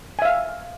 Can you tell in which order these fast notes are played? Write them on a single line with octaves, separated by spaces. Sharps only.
G#5 E5 F5